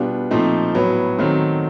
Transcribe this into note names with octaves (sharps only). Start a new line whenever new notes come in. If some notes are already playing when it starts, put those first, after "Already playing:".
Already playing: B2 G3 B3 D4 F4 G4
A#2 F3 A3 C4 D#4
A2 F#3 B3
D#3 F#3 A3 C4